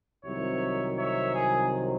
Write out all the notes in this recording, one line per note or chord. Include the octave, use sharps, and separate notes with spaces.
C2 C3 D#3 F#3 C#5 E5
C#5 E5
G#4